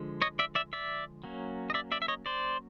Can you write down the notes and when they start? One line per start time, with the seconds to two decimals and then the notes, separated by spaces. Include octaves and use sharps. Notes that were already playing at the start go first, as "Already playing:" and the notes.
Already playing: D3 F3 G#3
0.22 C#5 D#5
0.39 D5 E5
0.55 D5 E5
0.73 D5 E5
1.24 F#3 A#3 C#4
1.70 D#5
1.74 D5 E5
1.92 D5 E5
2.02 E5
2.08 C#5 D#5
2.26 C5 D5